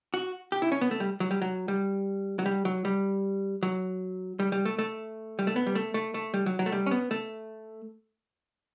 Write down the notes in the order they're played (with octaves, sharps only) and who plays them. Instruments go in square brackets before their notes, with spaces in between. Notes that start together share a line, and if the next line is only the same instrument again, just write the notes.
[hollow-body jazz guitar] F#4
G4
E4
C#4
B3
A3
G3
F#3
G3
F#3
G3
F#3
G3
F#3
G3
F#3
G3
G3
A3
A3
G3
A3
B3
G3
A3
A3
A3
G3
F#3
F#3
A3
G3
C#4
B3
A3